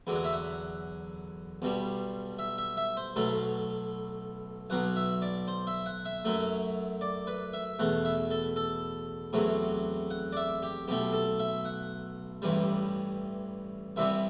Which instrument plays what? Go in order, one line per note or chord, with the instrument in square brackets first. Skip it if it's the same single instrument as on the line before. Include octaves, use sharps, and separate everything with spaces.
[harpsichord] E2 D3 F#3
F#5
E5
F#5
B1 B2 G3
E5
E5
E5
C5
B1 B2 F#3 A3 A4
B1 B2 F#3 F#5
E5
D5
C5
E5
F#5
E5
F#2 F#3 A3
D5
B4
E5
E2 B2 A3 F#5
E5
A4
A4
E2 C3 F#3 A3
F#5
D5
E5
G4
B1 B2 A3 G4
A4
E5
F#5
A1 G2 E3 G3
C2 C3 E3 G3 E5